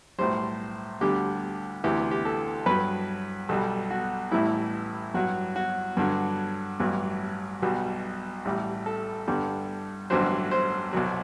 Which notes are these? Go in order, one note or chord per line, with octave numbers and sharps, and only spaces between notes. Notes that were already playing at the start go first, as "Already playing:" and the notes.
B1 A2 G3 C5
D2 D3 G3 G4
D2 C3 E3 G4
G4
A4
G2 F#3 B4
B1 B2 G3 A4
F#4
A1 A2 E3 G3 E4
G2 F#3 F#4
F#4
G2 D3 F#3
A1 G2 F#3
B1 B2 G3
A1 A2 G3
A4
G2 D3 G3
A1 G2 D3 F#3 C5
C5
C2 B2 F#3